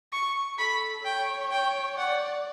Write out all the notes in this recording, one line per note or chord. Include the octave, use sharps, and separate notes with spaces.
C#6
A4 B5
C#5 G5
G5
D5 F#5